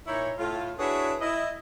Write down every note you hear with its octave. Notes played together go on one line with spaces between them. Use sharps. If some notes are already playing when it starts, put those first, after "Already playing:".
A#2 D#4 E4 C#5
A2 F4
D4 E4 F#4 G#4 B4 C#5
E4 D#5